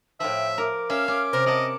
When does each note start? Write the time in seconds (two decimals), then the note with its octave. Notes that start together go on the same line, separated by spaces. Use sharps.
0.20 A2 F3 E5 G5
0.58 A#4 D6
0.90 C#4 E5 F5
1.08 C#4 D6
1.33 C3 A#4 C5
1.46 A#4 D#5 F#5 A5